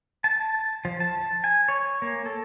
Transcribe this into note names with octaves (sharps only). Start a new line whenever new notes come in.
A5
F3
A5
G#5
C#5
A#3
A4